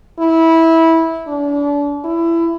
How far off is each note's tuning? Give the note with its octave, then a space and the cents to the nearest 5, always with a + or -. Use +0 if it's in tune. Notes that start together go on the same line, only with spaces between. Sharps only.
E4 -15
D4 -35
E4 +20